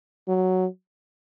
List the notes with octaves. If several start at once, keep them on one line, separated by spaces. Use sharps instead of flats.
F#3